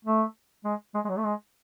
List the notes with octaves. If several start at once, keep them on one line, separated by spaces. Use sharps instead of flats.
A3
G#3
G#3
G#3
F#3
A3
G#3